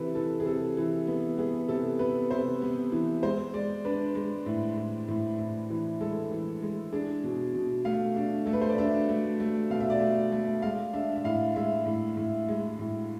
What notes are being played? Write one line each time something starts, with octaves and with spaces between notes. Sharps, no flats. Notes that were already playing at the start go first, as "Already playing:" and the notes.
Already playing: C3 E3 A4 B4
E3 A4
G#4
C3 A4
E3
B3
B3 G#4
C3 A4
B3 B4
C3 C5
B3
E3
G#3 C5
G#3 D5
D4 B4
G#3
A2
A2
A2
A2
E3
G#3 A4
E3
G#3
D4 G#4
B2
B2
A3 F5
D4
A3 A4
B4
C5
D5
D4 E5
A3
A3
B2 F5
E5
D5
A3 E5
A3
G#3 F5
D4 E5
E5
A2 F5
G#3 E5
A2
A2
G#3
A2